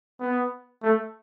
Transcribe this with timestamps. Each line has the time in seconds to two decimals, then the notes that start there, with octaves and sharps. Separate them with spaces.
0.20 B3
0.83 A3